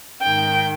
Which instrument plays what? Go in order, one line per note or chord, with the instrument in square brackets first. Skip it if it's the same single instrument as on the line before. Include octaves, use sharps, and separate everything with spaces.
[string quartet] G#2 D#3 G5